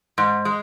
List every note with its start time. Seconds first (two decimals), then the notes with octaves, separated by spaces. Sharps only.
0.18 G#2
0.45 G#3